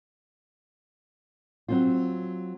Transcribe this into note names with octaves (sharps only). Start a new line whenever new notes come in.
F#3 C4 F4